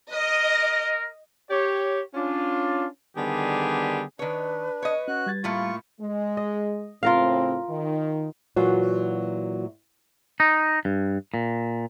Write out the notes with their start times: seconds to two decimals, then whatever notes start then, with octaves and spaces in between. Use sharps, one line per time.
0.13 A#4 D#5
1.51 G4 C#5
2.14 C#4 D4 F4
3.16 D3 D#3 G3 B3 G4 G#4
4.19 D#3 D4 B4 C#5
4.82 C#5 D#5
5.08 C#4 F#4 F#6
5.26 G3 G#6 A6
5.44 A2 A3 A#3 F4 C#6
6.00 G#3
6.37 D#5
7.03 A2 C#3 C4 F4 A#4 F5
7.69 D#3
8.56 A#2 E3 F#3 F4 F#4
10.40 D#4
10.85 G2
11.34 A#2